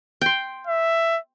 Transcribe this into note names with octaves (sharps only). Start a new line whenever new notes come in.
G5 C6
E5